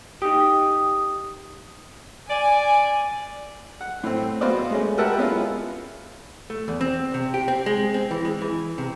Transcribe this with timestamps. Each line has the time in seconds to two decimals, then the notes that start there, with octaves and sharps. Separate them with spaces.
0.22 D#4 G4 D#6
2.29 D5 G#5
3.81 F#5
4.03 A2 C4
4.41 B3 F#4 C5 D5 F5
4.70 G#3 A3 C#4
4.98 G4 A#4 B4 E5 F#5 A5
5.18 G#3 B3 C#4 E4 F4
6.50 A3
6.68 E2
6.81 C4
7.14 C3
7.34 G4
7.48 C4
7.66 G#3
7.94 C4
8.11 E3
8.25 G#3
8.41 E3
8.78 C3